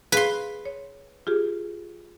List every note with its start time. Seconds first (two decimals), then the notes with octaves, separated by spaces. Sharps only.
0.12 G#4 B4 F5 C6
0.66 C#5
1.27 F4 G4 G#4